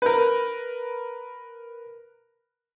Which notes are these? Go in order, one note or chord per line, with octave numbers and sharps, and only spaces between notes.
A#4 B4